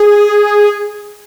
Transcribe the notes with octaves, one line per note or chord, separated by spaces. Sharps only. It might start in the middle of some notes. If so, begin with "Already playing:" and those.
Already playing: G#4